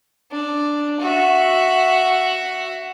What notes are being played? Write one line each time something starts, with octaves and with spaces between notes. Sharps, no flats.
D4
F#4 E5